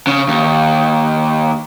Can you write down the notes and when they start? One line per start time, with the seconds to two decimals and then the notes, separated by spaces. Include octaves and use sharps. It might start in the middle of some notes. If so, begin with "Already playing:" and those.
0.07 C#3
0.28 D#2